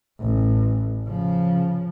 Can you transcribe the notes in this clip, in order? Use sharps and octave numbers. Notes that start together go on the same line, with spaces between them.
A1
C#3 F3